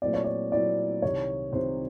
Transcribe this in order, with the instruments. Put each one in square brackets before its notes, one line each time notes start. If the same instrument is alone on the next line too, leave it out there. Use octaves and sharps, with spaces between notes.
[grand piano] A#2 F#3 A3 C4 E4 [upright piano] D5
[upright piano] C#5
D5
[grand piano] A#2 F#3 A3 C4 E4 [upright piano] D5
[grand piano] C2 C3 D#3 [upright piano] C#5
[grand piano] C2 C3 D#3 [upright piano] C5